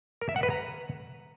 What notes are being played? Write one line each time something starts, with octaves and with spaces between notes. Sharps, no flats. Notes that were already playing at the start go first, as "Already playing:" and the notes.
A#4
E5
F#5
B4
A#5